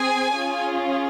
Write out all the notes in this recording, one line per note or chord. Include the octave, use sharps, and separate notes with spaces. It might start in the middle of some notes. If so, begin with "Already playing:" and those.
Already playing: C4 G#4 G#5
C#4 F4 G#4